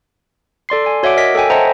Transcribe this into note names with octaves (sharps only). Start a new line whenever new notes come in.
A4 D5 C6 C7
D5 G#5
F#4 C#5 E5 F#5 D6 D7
A#4 D#5 B6
A4 C#5 G5 G#5
C5 D#5 E5 F#5 A5 A#5